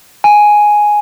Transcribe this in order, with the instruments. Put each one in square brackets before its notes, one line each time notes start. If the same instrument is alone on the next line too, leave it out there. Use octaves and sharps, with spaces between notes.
[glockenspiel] G#5